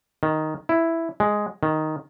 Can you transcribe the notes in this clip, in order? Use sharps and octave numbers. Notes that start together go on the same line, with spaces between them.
D#3
E4
G#3
D#3